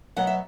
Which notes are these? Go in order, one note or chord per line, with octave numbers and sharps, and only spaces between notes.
B2 F#3 B3 F#5
E5